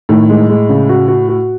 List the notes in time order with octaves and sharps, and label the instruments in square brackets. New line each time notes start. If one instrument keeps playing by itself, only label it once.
[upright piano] A2 [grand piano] D#3
[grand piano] G#3
G#3
C#3
F#4
F#4
F#4